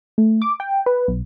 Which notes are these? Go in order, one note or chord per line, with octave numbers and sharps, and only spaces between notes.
A3
D6
G5
B4
B1